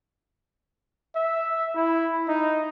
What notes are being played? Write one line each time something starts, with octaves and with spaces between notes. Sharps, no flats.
E5
E4
D#4